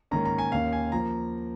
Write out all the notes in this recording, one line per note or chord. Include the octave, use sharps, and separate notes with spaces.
G#2 D#3 A#3 C#4 A#5
A#5
G#5
D#2 D#3 A#3 C#4 F5
G#5
F3 A#3 A#5